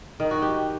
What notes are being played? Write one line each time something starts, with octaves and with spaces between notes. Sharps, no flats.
D#3
F#4
G4